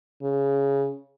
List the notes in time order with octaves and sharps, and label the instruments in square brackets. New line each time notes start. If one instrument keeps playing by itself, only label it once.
[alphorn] C#3